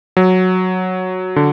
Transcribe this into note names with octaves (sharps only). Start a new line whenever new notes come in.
F#3
D3